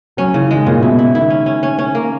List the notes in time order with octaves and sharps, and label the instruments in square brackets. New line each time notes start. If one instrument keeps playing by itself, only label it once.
[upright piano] F#3 [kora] C#4
[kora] C#3 [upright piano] E3
[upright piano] E3
[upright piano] D#3 [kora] G#3
[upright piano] A#2 [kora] C#3
[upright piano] B2 [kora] E4
[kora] E4
[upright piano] D#3 [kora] E4
[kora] C#4
C#4
C#4
C#4
A#3